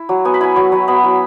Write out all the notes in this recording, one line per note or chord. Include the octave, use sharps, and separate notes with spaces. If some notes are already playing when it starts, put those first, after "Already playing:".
Already playing: E4
F#3
B3 G#5
B5
E4 G#5
F#3 C#6
F#3
B3 B5
E4